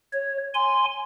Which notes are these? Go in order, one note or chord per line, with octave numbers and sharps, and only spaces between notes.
C#5
G#5 C6